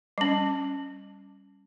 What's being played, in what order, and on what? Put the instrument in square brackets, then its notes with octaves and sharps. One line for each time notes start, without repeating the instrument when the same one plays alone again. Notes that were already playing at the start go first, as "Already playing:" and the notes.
[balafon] G3 C#4